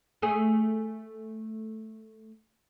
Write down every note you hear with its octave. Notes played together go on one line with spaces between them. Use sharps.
A3 G#4